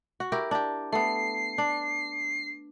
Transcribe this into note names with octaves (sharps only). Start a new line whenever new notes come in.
F#4
E4 G4 A#4
D4 G4
A3 B3 C7
D4